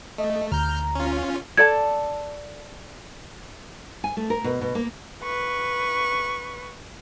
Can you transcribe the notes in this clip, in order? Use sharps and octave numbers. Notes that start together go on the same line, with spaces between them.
A3 D#5
D2 A#5 F6 G6
C#4 F4
A4 D5 A5 G#6
G#5
A3
A#4
B2
B2
A#3
B4 C#6